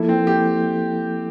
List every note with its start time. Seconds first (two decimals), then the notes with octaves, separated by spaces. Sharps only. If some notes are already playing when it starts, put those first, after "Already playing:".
Already playing: F3 A#3 E4 A4
0.09 C4
0.27 G4